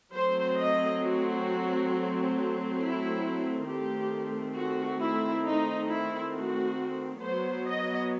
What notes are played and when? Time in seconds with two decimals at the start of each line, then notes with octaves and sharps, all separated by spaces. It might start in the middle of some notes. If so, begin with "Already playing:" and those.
0.15 F#3 A3 C4 C5
0.59 D#5
1.03 F#4
2.80 E4
3.68 D#3 A3 C4 G4
4.57 F#4
5.01 E4
5.46 D#4
5.90 E4
6.34 F#4
7.23 F#3 B3 C5
7.67 D#5